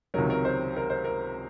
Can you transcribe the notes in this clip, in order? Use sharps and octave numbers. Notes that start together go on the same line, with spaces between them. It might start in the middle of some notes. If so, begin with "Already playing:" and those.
C#2 C3 D#3 F#3 A#4
A#4
C5
A#4
C5
A#4